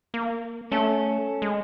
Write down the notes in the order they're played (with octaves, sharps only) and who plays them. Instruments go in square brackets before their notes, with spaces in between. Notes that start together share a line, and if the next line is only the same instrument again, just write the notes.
[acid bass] A#3
[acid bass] A3 [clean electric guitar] C#4 A4
[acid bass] G#3